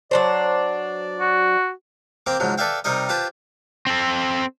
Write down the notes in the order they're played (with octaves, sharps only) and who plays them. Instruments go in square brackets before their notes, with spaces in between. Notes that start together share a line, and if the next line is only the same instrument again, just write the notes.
[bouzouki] F#3 D4 C5 [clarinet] D5
[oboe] F#4
[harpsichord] A#3 C4 G4 C5
G#2 C#3 F3 F#3
A4 B4 D5 E5 F5 G5
C3 G3 D#4 A#4 D#5
F4 G4 B4 C5 A5
[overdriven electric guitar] C4 A4